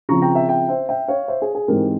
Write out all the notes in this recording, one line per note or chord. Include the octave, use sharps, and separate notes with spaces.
C#3 F3 C4 A#5 C#6
G5 A#5
E5 G5
E5 G5
C5 E5
E5 G5
C#5 F5
C5 E5
G#4
G#4
G#2 E3 G#3 C4 G4 A#4